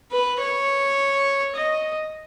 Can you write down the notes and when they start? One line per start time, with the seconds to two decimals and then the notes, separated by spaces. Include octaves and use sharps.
0.11 B4
0.40 C#5
1.56 D#5